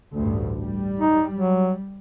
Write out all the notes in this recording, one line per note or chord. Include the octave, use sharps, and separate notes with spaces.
A1 D2 G2
G3
D#4
F#3